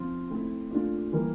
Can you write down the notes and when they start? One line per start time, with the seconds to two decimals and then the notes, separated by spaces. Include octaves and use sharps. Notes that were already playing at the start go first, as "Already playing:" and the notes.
Already playing: F3 C4 F4
0.30 A3 C4 E4
0.70 A#2 A3 D4 F4
1.12 E3 G3 A#3 E4 A#4